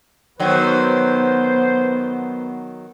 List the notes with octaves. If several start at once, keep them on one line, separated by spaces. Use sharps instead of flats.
D#3 F#3 B3 C5